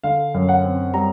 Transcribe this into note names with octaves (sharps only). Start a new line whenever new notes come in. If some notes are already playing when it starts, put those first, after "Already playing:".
D3 F5
F#2
F#5
C4
G3 A#5